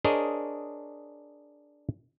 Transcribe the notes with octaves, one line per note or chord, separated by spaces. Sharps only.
D4 G#4 A#4 C5 C#5 D#5